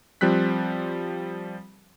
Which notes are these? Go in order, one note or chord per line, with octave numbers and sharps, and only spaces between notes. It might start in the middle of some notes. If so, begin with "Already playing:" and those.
F3 G3 C4 F#6 B6